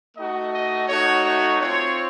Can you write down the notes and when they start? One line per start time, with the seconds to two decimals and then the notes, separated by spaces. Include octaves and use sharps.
0.17 A3 D#4 F#4 D#5
0.53 D#5
0.88 A3 D#4 F#4 C#5
1.25 C#5
1.60 C4 F4 C#5